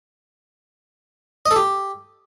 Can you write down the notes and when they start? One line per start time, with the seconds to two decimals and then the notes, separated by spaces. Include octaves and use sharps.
1.46 D#5
1.51 A4
1.56 G4